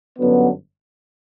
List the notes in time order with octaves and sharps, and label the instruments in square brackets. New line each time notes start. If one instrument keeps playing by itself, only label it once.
[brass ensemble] G1 F#2 D3 F#3 B3